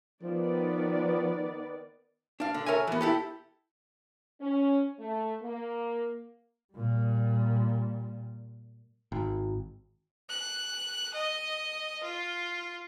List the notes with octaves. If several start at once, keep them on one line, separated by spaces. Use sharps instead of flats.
D#3 F3 B3 D5
D4 F5
D3
A4 A#4 C#5 E5 G#5
E3 B3
E4 G4 A4
C#4
A3
A#3
A#2 G3
G#1
F#6
D#5
F4